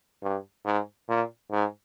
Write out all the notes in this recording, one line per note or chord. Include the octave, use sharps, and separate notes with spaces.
G2
G#2
A#2
G#2